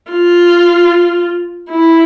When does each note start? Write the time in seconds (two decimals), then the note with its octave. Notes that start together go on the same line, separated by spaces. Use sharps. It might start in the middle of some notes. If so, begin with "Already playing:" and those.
0.11 F4
1.71 E4